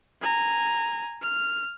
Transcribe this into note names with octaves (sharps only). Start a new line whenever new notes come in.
G#5 A#5
F6